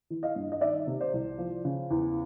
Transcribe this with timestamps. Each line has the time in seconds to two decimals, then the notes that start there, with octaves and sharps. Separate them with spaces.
0.10 E3
0.23 D#5 F5
0.36 G2
0.52 D#5
0.61 D#3 D5 E5
0.87 C3
1.01 C5 D5
1.13 C2
1.38 F3
1.65 C#3
1.91 E2